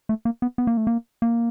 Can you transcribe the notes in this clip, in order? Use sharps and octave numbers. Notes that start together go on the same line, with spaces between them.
A3
A#3
B3
B3
A#3
A3
A#3
A#3